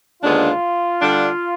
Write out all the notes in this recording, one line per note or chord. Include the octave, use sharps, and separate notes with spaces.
D#2 D3 G#3 B3 D4 F4
D3 G3 D4